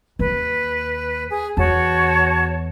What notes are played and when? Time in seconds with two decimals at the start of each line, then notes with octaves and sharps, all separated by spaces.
0.19 D#2 B4
1.30 G#4
1.57 E2 F#4 C#5 A5